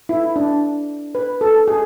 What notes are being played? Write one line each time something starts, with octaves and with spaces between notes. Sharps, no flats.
E4
D4
B4
A4
G#4